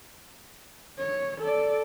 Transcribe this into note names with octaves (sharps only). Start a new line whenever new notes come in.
C#5
A4 D5